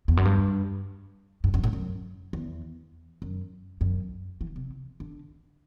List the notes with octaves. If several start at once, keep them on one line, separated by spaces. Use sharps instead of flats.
E2
F#2
G2
G2
F#2
A2
F#2
E2
F#2
F#2
E3
C3
D3